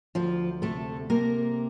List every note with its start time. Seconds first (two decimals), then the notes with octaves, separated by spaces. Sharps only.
0.15 D2 F3 F4
0.62 C3 A3 A4
1.10 C3 A#3 A#4